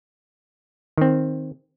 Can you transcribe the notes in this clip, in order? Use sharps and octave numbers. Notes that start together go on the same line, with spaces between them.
D#3 C4